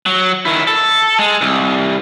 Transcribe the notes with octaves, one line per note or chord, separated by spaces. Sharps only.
F#3
D#3 E4
A4
G#3
C2